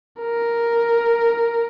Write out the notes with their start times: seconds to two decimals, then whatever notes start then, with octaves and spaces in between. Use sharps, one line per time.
0.21 A#4